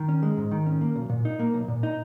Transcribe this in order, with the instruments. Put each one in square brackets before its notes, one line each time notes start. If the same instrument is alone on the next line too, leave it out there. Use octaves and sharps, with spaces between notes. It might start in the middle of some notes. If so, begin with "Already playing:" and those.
Already playing: [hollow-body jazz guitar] D#3
C#4
G#3
G#2
D#3
C#4
A#3
B1
A#2
D#4
A#3
B1
A#2
D#4